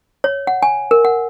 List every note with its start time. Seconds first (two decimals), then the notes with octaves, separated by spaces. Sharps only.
0.24 C#5
0.47 F#5
0.63 G#5
0.91 A#4
1.05 F#5